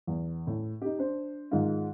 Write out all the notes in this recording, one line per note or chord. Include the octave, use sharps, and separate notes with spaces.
E2
A2
D#4 G4
D4 C5
G#2 D#3 G#3 D#4 F4